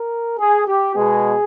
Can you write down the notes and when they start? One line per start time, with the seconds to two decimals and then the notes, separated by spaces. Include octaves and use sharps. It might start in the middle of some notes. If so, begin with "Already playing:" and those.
Already playing: A#4
0.38 G#4
0.67 G4
0.95 B2 G#3 B3 G#4